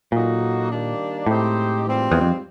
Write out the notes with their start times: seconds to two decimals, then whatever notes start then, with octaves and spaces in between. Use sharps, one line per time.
0.12 A#2 F#3 A#3 D#4 F#4 A4
0.70 D#3 G3 A#3 D4
1.26 A2 G#3 C4 D#4 G4 C5
1.84 G#2 E3 G3 C4 F4
2.11 E2
2.21 F2